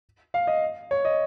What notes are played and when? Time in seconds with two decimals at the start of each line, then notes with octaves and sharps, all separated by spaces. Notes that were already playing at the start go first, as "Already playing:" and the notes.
0.34 F5
0.47 D#5
0.91 C#5
1.05 D#5